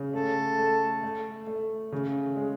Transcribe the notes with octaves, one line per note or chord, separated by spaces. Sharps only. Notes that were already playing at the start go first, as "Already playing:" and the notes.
Already playing: C#3
A3 A4
A3
A3
A3
C#3
G#3